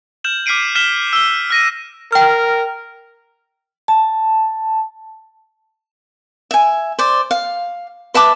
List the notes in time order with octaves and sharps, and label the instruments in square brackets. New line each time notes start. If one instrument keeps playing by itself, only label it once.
[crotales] F6 G6 E7 F#7
D6 F6 B6 C7 D7 D#7
F6 B6 E7 G7
E6 G7
F6 A#6 D#7
[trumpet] A#4 [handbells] G5 F6
[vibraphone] A5
[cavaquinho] E5 G#5
C5 D5
F5
B4 E5 A5 D6